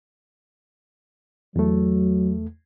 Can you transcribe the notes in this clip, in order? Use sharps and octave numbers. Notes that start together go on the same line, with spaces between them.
E2 F#3 A3